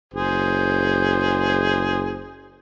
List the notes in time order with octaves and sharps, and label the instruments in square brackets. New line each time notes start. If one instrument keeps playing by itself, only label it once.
[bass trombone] F#1 [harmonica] G#4 C5